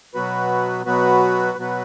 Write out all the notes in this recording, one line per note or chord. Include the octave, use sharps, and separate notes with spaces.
B2 F#3 B3 F#4 B4
B2 F#3 B3 F#4 B4
B2 F#3 B3 F#4 B4